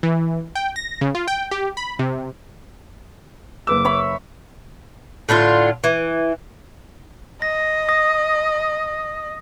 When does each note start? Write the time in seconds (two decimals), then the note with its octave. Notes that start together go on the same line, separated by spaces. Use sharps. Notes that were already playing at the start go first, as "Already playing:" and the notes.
0.03 E3
0.55 G5
0.76 A#6
1.01 C#3
1.15 F4
1.28 G5
1.51 G4
1.77 B5
1.99 C3
3.67 F#1 B4 D6 E6
3.85 C#5 E5 B5
5.29 A2 D3 D4 F4
5.84 E3
7.42 D#5 A#6
7.89 D#6 A#6